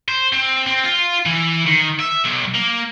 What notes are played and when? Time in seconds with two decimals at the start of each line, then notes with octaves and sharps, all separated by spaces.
0.08 C5
0.33 C4
0.67 C4
0.84 F4
1.26 E3
1.67 D#3
2.00 E5
2.25 B1
2.55 A#3